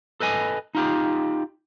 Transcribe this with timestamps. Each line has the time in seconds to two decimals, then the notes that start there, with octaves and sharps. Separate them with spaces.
0.20 A4 B4 D#5 G#5
0.75 D#4 F4 G4